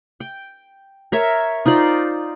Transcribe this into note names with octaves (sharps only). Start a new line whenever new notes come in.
G5
A#4 C#5 E5
D#4 F4 C5 D5